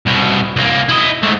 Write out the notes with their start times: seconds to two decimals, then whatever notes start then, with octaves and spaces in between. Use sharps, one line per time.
0.06 C2 B2
0.56 C2 A#3
0.89 E4 D#5
1.23 G#2 A3